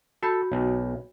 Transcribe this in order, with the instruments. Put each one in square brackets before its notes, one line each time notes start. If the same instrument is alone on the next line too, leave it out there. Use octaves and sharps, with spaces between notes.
[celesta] F#4 B5 G6 [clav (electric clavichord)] A4
[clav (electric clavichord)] B1